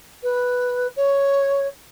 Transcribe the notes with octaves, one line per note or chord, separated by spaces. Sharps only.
B4
C#5